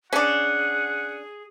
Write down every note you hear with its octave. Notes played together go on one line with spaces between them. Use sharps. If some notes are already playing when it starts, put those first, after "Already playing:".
C#4 D4 G#4 F#5